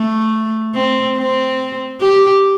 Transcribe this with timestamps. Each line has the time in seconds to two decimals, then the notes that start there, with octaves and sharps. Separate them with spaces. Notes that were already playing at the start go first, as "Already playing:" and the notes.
Already playing: A3
0.75 C4
1.18 C4
2.01 G4